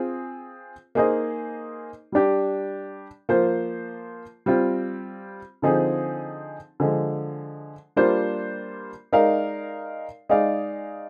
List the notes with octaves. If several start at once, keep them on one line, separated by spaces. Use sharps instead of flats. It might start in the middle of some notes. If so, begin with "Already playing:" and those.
Already playing: C4 F4 G#4
A#3 D#4 G#4 C5 D#5
G3 D4 G4
F3 A#3 F4 C5
G3 C4 F4
D3 F3 C4 D#4 G#4
D3 F3 G#3
G3 A#3 D4 F4 C5
G#3 D#4 A#4 D5 F5
G#3 D#4 G#4 D5 F5